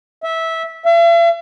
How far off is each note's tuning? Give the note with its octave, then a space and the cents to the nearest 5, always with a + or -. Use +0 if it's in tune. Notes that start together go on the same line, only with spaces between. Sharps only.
E5 -15
E5 +45